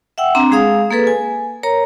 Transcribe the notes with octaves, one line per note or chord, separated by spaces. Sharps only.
E5 F#5 G5 E6
C4 D4 A#5
G#3 G#4 F5 D#6
A#3 G#4 A4 B4
G#5
A#4 C#5 A#5